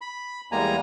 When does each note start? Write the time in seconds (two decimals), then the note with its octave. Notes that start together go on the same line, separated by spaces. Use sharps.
0.01 B5
0.52 E2 G3 G#3 A#3 G#5 A#5